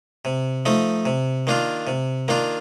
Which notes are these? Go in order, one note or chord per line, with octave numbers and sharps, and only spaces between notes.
C3
F3 A3 D#4
C3
D#3 A#3 D4 F4
C3
D#3 A#3 D4 F4